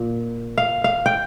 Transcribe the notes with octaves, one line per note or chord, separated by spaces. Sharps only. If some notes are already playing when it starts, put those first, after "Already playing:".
Already playing: A#2
F5
F5
G5